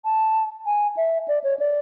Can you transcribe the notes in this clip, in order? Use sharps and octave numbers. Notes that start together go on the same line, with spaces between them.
A5
G#5
E5
D5
C#5
D5